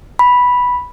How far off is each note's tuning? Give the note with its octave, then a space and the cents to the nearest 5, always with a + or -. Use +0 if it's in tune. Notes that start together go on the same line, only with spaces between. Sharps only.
B5 -5